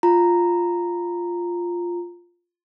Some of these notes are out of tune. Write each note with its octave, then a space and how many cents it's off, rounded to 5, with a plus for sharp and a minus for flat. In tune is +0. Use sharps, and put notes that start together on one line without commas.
F4 +0 A#5 -5